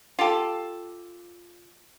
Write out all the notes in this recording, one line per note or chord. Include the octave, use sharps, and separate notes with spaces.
F4 G4 A4